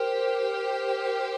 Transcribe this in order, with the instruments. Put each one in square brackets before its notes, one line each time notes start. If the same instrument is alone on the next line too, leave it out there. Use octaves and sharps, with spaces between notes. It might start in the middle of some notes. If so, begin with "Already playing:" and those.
Already playing: [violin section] G4 C5 G5 [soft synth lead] A#4